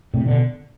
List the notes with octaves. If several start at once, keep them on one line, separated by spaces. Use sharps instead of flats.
A2 C3
B2 D3